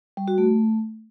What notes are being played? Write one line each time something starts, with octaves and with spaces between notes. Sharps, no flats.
G3
F#4
A3